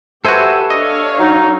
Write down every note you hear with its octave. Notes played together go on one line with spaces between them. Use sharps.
F#4 G4 A4 B4 C5 E5 G#5
D4 C#5 D#5 F5
F#3 D#4